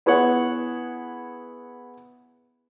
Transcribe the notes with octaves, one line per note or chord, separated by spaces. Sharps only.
B3 E4 G#4 B4 C#5 F#5